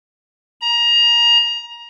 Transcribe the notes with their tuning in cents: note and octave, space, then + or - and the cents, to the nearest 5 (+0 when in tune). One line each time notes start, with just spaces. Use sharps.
A#5 +25